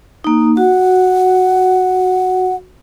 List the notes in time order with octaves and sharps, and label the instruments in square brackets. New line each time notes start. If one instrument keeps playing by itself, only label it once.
[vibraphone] A#3 D#4
[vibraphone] F#4 [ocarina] F#5